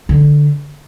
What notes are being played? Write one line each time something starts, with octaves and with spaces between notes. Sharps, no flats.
D3